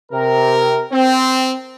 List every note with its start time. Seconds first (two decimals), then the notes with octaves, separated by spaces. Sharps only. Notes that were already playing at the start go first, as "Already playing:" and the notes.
0.12 C3 A#4
0.92 C4